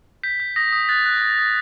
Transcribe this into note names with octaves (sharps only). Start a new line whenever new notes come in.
G6 B6
G6
D#6 A#6
D#6
F#6 A6
F#6
D#6
D#6